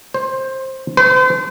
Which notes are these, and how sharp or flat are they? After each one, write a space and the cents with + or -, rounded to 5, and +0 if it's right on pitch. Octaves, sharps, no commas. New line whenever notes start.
C5 +15
C5 -40